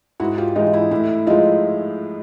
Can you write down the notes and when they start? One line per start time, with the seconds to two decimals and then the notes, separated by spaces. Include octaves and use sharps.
0.20 G#2 E4 F#4
0.38 F4 G4
0.55 E3 G#3 D#4 F4
0.73 E4
0.91 A2 E4
1.27 F3 G#3 D#4 F4